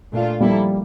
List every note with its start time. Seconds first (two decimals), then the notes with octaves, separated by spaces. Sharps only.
0.12 A#2 A3 D4 F4
0.40 F3 G3 A#3 E4 A4